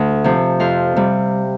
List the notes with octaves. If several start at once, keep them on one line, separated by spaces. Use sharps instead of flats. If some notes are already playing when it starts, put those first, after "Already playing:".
Already playing: D2
C3 F3
F2 F5
C3 G3